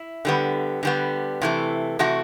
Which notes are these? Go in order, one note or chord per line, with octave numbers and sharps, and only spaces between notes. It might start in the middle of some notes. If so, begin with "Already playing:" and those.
Already playing: E4
D3 G3 B3
D3 G3 B3
C3 E3 A3
C3 E3 A3 F#4